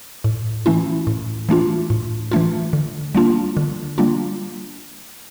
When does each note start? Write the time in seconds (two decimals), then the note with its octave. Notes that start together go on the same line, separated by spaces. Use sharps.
0.24 A2
0.66 E3 A3 C#4 E4
1.07 A2
1.49 E3 A3 D4 F4
1.90 A2
2.31 E3 A3 D4 F4
2.73 D3
3.15 G3 A#3 D4 F4
3.57 D3
3.98 G3 A#3 D4 F4